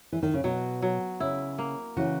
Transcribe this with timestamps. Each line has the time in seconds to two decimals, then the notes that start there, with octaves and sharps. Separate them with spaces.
0.12 E3
0.23 D#3
0.34 C#3
0.44 B2 F#3
0.82 F#3
1.20 C#3 E4
1.58 A#3
1.97 C#3 E3 F#4